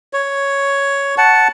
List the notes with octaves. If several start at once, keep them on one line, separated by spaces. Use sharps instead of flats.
C#5
F#5 A5